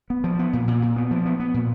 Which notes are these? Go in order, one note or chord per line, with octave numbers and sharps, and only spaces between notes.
B3
F3
B3
A#2
A#2
A#2
B3
F3
B3
B3
A#2